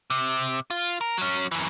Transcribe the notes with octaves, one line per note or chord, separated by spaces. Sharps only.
C3
F4
A#4
F#3 C#4
F#2 E3